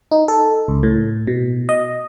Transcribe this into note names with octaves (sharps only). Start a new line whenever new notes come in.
D#4
A4
C#2
A2
B2
D#5